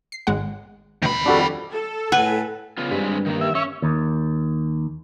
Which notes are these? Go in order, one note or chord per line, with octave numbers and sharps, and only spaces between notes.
C7
G#1 G#3 F#5
D2 B2 D#3 B5
F2 G3 D4 F#4 A4
A4
A2 B4 F#5 G#5
C#3 B3 F4
G2 G#3 C4 B4
D#3 A#3
E5
C#4 E5 C#6
D#2